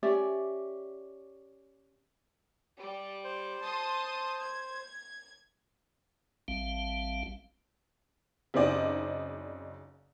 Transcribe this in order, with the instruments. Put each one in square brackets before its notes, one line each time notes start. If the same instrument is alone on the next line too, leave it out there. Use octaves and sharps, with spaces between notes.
[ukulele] C#4 G4 D5 E5
[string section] G3
[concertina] C5
[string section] A5 C6 D#6
G#6
[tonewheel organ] A1 G3 C4 F5
[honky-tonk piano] F#1 C#3 C4 D#4 D5 D#5